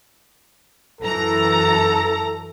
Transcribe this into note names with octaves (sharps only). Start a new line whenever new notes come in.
F#2 E3 A4 A#5